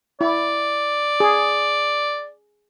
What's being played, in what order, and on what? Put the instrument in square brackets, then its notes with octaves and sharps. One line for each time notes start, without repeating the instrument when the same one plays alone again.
[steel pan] E4 [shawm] D5
[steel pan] G#4